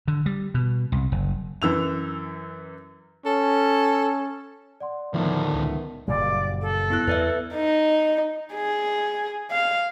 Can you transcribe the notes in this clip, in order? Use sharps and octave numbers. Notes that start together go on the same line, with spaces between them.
D3
G3
B2
C2
F#1
F#2 E3 E6 F7
C#4 A4
D5 F#5 C6
D2 A2 D#3 F3 A3 B3
C#2
F#1 A#2 G3 D5
A4
B3 E4 F#6
E2 B4 D5 E5
D#4
G#4
F5